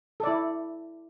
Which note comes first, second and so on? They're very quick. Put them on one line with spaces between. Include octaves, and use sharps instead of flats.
A4 D5 E4